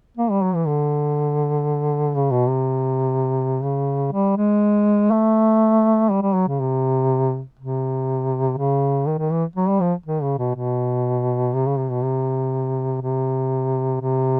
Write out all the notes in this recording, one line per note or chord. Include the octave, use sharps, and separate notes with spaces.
A#3
G3
F#3
E3
D3
C#3
B2
C3
C#3
G3
G#3
A3
G3
G3
F#3
C#3
C3
C3
C#3
D#3
D#3
E3
F#3
G3
F3
D#3
C#3
B2
B2
C3
C#3
C3
B2
C3
C3
C3